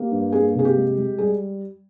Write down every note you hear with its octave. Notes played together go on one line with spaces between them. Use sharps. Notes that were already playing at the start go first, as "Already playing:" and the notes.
Already playing: A#3 G4
G2
A#3 G#4
C3
G#4
G4
G#3
G#3
G3 G#4